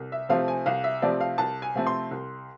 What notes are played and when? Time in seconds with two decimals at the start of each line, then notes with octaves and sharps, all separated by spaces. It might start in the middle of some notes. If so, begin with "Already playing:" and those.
Already playing: C2
0.12 E5
0.29 C3 F3 A3 C4 F5
0.48 G#5
0.66 C2 F5
0.84 E5
1.02 C3 F3 A3 C4 D5
1.21 F5
1.38 C2 A5
1.62 G#5
1.75 C3 F3 A3 C4
1.87 C6
2.11 C2